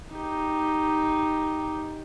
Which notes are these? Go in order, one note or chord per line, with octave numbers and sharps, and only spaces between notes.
D#4 G4